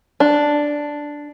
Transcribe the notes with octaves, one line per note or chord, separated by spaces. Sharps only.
D4